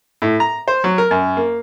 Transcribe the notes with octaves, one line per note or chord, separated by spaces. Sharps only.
A2
A#5
C5
F#3
A#4
F#2
A#3